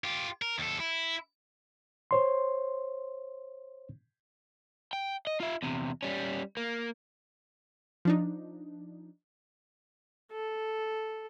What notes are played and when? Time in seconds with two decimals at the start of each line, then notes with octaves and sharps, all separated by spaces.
0.04 F4 G4
0.42 A#4
0.58 D#2 A4
0.80 E4
2.11 C5 C#5 C6
4.93 G5
5.27 D#5
5.40 F4 E5
5.62 E2 C3
6.03 G3 C#4
6.57 A#3
8.05 F3 D4 D#4
10.32 A4